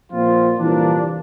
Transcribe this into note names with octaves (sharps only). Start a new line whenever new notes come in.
A#2 F3 C4 F4
C2 A#2 E3 F3 A#3 D4